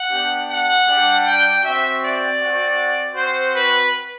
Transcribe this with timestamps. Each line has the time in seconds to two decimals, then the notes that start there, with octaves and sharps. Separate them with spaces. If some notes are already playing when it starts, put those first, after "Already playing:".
Already playing: F#5
0.10 B3 D4 G4
0.49 F#5
0.86 G3 D4 G4
1.25 G5
1.62 C4 F#4 E5
2.01 D5
2.40 C4 F#4
3.15 C4 F#4 C5
3.54 B4